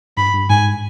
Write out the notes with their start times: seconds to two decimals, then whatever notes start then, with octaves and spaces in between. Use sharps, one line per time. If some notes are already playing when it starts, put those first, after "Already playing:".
0.17 G2 B5
0.34 G2
0.50 G#2 G#5